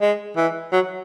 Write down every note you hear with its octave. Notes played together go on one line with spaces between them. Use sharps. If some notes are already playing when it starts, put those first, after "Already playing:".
G#3
E3
F#3